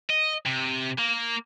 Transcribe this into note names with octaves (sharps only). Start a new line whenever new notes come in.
D#5
C3
A#3